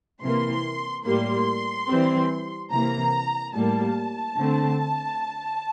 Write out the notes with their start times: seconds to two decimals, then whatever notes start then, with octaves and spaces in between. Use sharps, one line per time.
0.21 C3 E3 A#3 C6
1.05 A2 G3 A#3 C6
1.88 E3 G3 C4
2.71 C3 E3 A#3 A#5
3.54 A2 G3 A#3 A5
4.37 D3 A3 C4